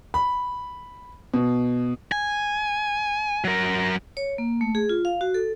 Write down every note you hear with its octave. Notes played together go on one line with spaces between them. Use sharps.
B5
B2
G#5
F#3 A#4
C#5
A#3
A3
G#4
F4
F5
F#4
A4